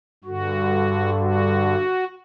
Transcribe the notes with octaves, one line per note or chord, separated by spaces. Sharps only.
G2 D3 F#4
F#4